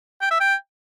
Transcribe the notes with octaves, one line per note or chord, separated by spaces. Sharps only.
G5
E5
G5